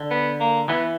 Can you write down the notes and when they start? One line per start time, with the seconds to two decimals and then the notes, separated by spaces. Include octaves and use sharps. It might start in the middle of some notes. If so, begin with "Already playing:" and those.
Already playing: D3
0.11 B3
0.40 A#3
0.69 E3 B3